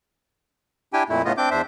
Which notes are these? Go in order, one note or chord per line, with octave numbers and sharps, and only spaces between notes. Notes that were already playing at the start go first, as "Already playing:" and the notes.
D4 E4 G4 G5 G#5
F2 A#2 A3 E4
A2 C#3 A3 B3 F4 D#5
C4 D4 D6 G6
E2 D4 C5 E5